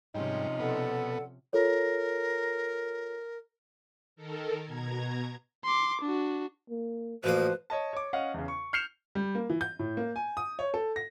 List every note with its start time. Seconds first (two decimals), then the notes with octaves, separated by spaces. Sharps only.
0.15 G#2 C3 F3 G3 C#4 D#4 C#5
0.60 B2 B3 A4 D5 F#5
1.53 F4 A4 A#4 C#5
4.16 D#3 A4 A#4
4.64 B2 A#5 G#6
5.64 C6 D6
6.01 D4 F#4
6.70 A#3
7.24 A1 F3 A#3 F#4 B4 C5 D#6
7.70 C#5 D#5 A5
7.93 C#5 D6
8.13 C#4 D#5 F5 F#5
8.34 E2 C#3
8.48 C#6
8.73 F6 G6 C7 C#7 E7 F7
9.15 G3
9.35 A#3
9.50 E3
9.61 G6
9.79 A2
9.97 A#3
10.16 G#5
10.37 D#6
10.59 C#5
10.74 A4
10.96 A#6